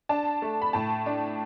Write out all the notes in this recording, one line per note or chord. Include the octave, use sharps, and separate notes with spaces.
D4 A5
A3
B5
A2 A5
D4